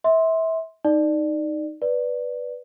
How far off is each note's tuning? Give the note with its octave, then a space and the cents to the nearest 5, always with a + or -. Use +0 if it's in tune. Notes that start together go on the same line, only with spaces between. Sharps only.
E5 -25 C6 +0
D#4 -5 D5 +15
B4 +0 D5 +0